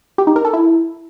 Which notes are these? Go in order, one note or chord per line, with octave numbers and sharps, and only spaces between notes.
G4
D#4
A#4
A4
E4